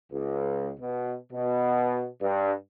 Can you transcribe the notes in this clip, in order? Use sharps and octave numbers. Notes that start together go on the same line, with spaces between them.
C#2
B2
B2
G2